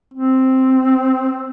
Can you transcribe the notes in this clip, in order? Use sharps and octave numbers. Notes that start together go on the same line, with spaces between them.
C4